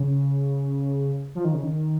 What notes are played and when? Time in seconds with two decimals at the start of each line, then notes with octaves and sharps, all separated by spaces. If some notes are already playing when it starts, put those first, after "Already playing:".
Already playing: C#3
1.35 F3
1.45 D#3
1.54 C#3
1.64 D#3